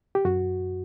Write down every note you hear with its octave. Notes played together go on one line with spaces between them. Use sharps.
G4
F#2 F#4